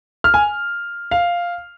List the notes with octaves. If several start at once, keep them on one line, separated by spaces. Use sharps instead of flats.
F6
G#5
F5